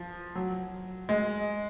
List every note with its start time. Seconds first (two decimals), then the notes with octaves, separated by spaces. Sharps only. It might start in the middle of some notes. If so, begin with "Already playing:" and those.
Already playing: F3
0.35 F#3
1.09 G#3